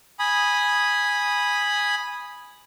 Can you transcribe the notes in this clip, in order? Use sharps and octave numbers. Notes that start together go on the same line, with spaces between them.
G#5 B5 D#6